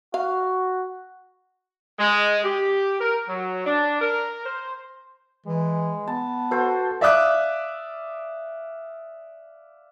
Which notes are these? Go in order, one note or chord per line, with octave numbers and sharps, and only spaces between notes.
F#4 F5
G#3
G4
A#4
F#3
D4
A#4
C5
E3 G#3
B3 A5
F#4 A4 B4 C5 F#5
D5 E5 F5 D6 D#6 F#6